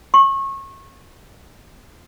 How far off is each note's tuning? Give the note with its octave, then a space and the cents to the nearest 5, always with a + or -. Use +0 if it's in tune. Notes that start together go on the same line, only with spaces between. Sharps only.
C#6 -30